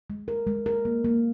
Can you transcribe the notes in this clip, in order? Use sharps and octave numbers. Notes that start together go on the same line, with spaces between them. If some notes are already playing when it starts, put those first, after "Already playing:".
G#3
A#4
G#3
A#4
A#3
A#3